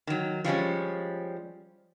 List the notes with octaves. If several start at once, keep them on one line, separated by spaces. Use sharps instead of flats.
D#3 F#3
F3 G3 G#3 C#4